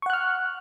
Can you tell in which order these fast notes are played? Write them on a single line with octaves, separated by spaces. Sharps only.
C#6 F#5 F#6 F6